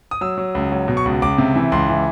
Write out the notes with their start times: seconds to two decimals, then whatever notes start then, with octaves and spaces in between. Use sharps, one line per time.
0.11 D#6
0.21 F#3 E6
0.38 F#3
0.55 C#2
0.72 F#3
0.88 B2
0.97 C#6
1.05 C#2
1.22 C#2 D6
1.38 C3
1.56 E3
1.72 C#2 C6
1.89 E3